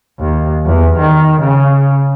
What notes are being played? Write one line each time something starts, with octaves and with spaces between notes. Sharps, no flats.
D#2
E2
D#3
C#3